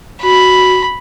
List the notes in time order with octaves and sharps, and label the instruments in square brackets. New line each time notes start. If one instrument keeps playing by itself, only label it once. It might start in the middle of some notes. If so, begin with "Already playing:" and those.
[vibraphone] F#4 [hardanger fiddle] B5